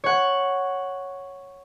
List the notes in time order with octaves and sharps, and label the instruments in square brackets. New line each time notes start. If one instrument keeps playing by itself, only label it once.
[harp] C#5 F#5